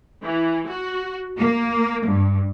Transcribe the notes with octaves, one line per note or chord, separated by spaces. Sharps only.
E3
F#4
A#3
G2